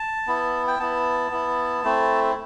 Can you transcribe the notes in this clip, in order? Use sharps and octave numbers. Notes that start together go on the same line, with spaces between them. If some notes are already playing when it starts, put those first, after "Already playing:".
Already playing: A5
B3 E4
G5
B3 E4 A5
B3 E4
A3 C4 E4